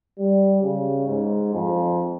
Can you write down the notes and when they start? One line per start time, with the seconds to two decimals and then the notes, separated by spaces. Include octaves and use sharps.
0.19 G3
0.62 C#3
1.07 G#2
1.53 F2